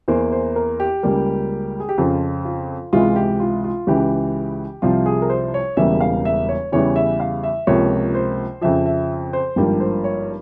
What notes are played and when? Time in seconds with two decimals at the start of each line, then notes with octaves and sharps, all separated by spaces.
0.08 E2 E3 A#3 C5
0.32 C5
0.56 A#4
0.80 G4
1.03 C#2 C#3 G3 A#3
1.80 G#4
1.89 G4
1.98 F2 C#3 F3 F4
2.45 F4
2.92 C#2 C3 E3 G#3 F4
3.16 G4
3.40 F4
3.64 F4
3.87 C#2 C#3 E3 G4
4.82 C2 C3 F3 F4
5.06 G#4
5.22 A#4
5.30 C5
5.54 C#5
5.77 E1 E2 C#3 G3 A#3 E5
6.00 F5
6.25 E5
6.49 C#5
6.72 E2 C#3 E3 G3 C#5
6.96 E5
7.20 F5
7.43 E5
7.67 C#2 C3 F3 A#3 C#5
8.15 C5
8.61 F2 C#3 F3 E5
8.86 E5
9.33 C5
9.56 G#1 G2 F3 A#3 G4
9.80 C5
10.04 C#5